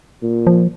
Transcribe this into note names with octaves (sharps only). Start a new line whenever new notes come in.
A#2
F3